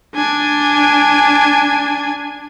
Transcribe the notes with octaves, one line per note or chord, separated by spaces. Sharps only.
D4 G#5